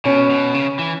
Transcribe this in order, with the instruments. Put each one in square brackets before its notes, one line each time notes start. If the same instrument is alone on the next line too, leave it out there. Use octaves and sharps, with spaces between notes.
[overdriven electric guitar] B2 [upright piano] C#4
[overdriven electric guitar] B2
C#3
E3